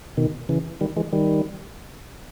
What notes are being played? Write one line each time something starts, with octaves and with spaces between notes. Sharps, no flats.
B2 D#3
C#3 E3
D#3 G3
E3 G#3
D#3 G3